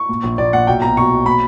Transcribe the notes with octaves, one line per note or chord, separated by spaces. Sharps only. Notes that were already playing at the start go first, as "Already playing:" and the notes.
Already playing: C#6
A#2
A#1
A#1 D5
A#2 F#5
B1 G5
B2 A#5
B2 C#6
B1
A#2 B5